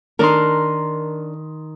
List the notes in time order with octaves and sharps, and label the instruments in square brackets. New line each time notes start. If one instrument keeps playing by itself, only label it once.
[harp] D#3 D#4 C6 [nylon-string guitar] D4 A#4